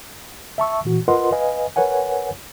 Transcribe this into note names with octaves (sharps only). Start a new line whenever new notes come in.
E5 A5 C#6 E6
A#2 E3 F#4
F4 A#4 B4 D#5 F#5 C6
B4 D#5 F5 G#5
A#4 B4 C#5 F#5 G#5